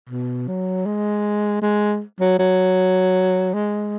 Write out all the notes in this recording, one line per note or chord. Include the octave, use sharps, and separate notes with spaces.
B2
F#3
G#3
G#3
F#3
F#3
G#3